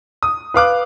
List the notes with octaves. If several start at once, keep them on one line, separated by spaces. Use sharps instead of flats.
D#6
B4 F5 D6 F#6